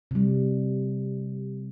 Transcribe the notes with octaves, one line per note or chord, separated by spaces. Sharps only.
C3 G3